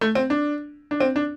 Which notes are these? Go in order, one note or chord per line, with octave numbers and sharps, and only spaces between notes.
A3
C4
D4
D4
C4
D4